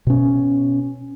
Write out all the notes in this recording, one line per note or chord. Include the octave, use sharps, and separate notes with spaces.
B2 C#4